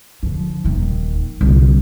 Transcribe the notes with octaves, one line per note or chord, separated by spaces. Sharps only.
D3 F3
D#1 D#3
C2 D3